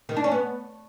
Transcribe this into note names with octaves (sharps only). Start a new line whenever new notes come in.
D#3
D4
C#4
B3